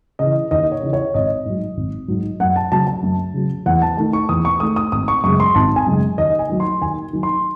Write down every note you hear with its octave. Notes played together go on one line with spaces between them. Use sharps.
C#3 E3 D#5
D#2 D#5
C#5
C#3 E3
C#5
G#1 D#5
G#2 F#3
G#1
G#2 F#3
F#2 F#5
A5
C#3 F#3 A5
A5
F#2
C#3 F#3
E2 F#5
A5
D#3 A3 A5
C#6
E2 D#6
C#6
D#3 A3 D#6
D#6
G#1 D#6
C#6
F#2 C#3 G#3 C#6
C6
G#1 A5
G#5
F#2 C#3 G#3
D#2 D#5
G#5
D#3 F#3
C6
D#2 G#5
D#3 F#3
C6